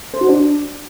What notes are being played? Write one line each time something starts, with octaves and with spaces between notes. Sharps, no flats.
C5
F#4
D4